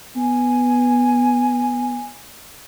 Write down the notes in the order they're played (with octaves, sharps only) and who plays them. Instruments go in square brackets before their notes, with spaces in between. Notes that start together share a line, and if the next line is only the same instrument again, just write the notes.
[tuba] B3 [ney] G#5